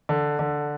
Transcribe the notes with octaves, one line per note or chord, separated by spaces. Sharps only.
D3
D3